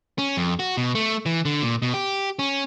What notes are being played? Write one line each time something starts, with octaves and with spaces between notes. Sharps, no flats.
C#4
F2
F#4
B2
A3
E3
D3
A#2
B2
G4
C#4